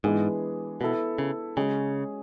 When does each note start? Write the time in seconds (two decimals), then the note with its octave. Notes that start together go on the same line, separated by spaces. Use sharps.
0.04 G#2 E3 G#3 B3 D4 G#4
0.81 B2 B3 E4 A4
1.18 C#3
1.57 C#3 G#3 C#4 G#4